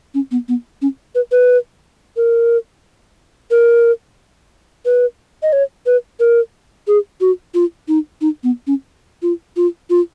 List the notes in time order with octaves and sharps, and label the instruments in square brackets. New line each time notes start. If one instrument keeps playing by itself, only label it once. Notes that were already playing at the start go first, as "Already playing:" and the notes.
[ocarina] C#4
B3
B3
C#4
B4
B4
A#4
A#4
B4
D#5
C#5
B4
A#4
G#4
F#4
F4
D#4
D#4
B3
C#4
F4
F4
F4